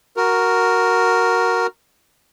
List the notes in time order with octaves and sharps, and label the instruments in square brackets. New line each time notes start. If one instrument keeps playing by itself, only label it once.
[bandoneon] F#4 A#4